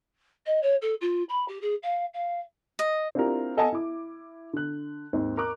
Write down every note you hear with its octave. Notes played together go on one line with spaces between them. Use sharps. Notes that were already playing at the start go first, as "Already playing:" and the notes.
D#5
C#5
A4
F4
B5
G4
G#4
F5
F5
D#5
C4 D4 E4 F4 G4 A#4
A4 D#5 F#5 G#5 A5
E4 D6
D3 F#6
D#2 G#2 C4
A#4 C#6 D6 F#6